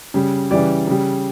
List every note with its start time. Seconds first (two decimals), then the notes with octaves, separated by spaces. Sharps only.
0.14 C#3 G3
0.51 C#3 E3 G3 D5
0.87 C#3 G3